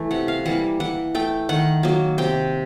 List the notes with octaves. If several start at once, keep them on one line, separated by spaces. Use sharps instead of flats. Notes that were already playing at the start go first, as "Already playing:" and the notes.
Already playing: E3 A3
C3 F#5
F5
E3 G3 A#3 F#5
E3 F#5
A3 G5
D#3 F#5
F#3 A#3
C3 G5